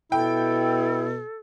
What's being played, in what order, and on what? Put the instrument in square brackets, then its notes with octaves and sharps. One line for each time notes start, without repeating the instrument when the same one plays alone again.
[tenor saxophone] B2 [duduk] E4 [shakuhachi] A4 [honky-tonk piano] G5